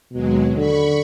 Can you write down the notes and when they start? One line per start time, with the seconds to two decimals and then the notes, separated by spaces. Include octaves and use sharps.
0.12 D#2 B2 F#3 G#3
0.57 D3 B5 C#6